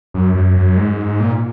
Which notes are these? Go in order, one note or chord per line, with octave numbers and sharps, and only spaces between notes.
F#2
F#2
F#2
G#2
A#2